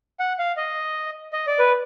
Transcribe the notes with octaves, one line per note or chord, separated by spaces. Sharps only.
F#5
F5
D#5
D#5
D5
B4